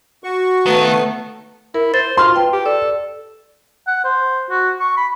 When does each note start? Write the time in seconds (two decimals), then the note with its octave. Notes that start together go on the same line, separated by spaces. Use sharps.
0.24 F#4 C#6
0.66 D#3 A3 B3
1.74 E4 A#4
1.94 C5 A6
2.17 F4 C6 F6
2.35 B4 G5 A5
2.53 G4
2.66 A4 D5
3.87 F#5
4.05 C5
4.50 F#4
4.80 C#6
4.97 B5